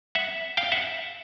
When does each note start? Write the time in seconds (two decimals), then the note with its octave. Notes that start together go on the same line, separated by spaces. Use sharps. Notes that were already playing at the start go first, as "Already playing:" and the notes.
0.15 E5 F#5
0.57 F5 G5
0.72 E5 F#5